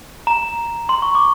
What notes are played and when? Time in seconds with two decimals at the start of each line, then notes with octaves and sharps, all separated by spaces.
0.27 A#5
0.89 C6
1.02 C#6
1.15 D6